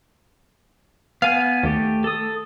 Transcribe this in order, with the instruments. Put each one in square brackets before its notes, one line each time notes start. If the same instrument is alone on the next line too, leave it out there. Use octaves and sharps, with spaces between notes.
[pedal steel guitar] B3 G#5 [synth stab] F5
[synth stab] D#2 [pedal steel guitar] A3 G4
[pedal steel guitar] A4 D#6